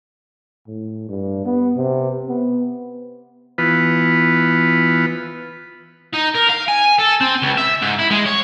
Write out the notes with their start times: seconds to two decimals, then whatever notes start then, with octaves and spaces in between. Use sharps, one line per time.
0.67 A2
1.09 G2
1.45 B3
1.76 C3
2.29 B3
3.58 E3 B3 F4 B4
6.13 D#4
6.35 A#4
6.49 F5
6.68 G#5
6.99 A4
7.21 C4
7.42 C#2
7.58 E5
7.82 G#2
7.99 E4
8.10 G#3
8.26 C#5